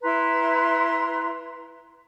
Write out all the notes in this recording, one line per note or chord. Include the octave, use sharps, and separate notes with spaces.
E4 B4 A#5 C6